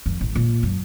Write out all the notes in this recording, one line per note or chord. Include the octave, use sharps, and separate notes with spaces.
F2
A1
A#2
F#2